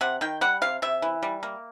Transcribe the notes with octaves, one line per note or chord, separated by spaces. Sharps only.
C3 F#5
D#3 G5
G3 F#5
C3 F5
C3 E5
E3
G3
A#3